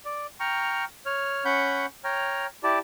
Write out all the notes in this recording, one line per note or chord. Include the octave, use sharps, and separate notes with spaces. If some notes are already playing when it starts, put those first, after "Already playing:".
D5
G5 A#5 C#6 F6
C#5 F6
C#4 F#5 B5 C#6 G6
C#5 G5 A#5 F6
E4 G4 D5 A5